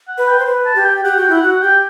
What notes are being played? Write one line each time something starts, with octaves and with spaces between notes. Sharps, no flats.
F#5
B4
G5
C5
B4
A5
G4
G5
G5
G4 F#5
F#4 G5
E4 F#5
F#4 F#5
G4 G5